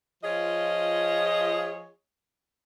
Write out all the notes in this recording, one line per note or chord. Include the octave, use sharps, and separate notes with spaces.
F3 F4 G#4 C#5 D#5